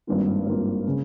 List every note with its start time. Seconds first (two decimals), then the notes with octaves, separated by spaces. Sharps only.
0.07 G#1 G2 D#3 A#3 F4
0.46 G#1 G2 D#3 A#3 F4
0.88 C#3 G#3